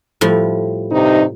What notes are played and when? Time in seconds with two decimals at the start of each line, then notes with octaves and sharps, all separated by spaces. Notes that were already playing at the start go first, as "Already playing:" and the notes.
0.21 A2 F3 G3
0.90 G2 C3 D#4